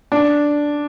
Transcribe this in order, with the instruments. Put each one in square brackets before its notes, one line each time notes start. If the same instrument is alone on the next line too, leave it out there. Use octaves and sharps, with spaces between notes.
[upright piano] D4